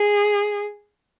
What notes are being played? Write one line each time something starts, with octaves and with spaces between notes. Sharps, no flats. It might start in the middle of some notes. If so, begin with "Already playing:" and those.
Already playing: G#4